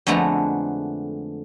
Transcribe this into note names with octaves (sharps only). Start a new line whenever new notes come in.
F2 D3 G#3 A3 B3 A#5